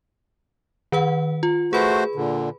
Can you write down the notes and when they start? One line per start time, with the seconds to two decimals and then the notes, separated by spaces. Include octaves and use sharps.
0.92 D#3 B4 F#5
1.43 F4
1.73 A3 F#4 G#4 B4 C5 B5
2.15 A#2 D3